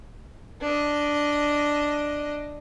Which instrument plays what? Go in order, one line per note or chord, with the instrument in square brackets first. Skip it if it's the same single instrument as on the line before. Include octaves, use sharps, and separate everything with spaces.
[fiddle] D4 D#5